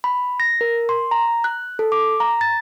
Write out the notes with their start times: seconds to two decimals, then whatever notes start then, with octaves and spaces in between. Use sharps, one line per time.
0.04 B5
0.40 A#6
0.61 A#4
0.89 C6
1.11 A#5
1.44 F#6
1.79 A4
1.92 D6
2.20 A#5
2.41 A6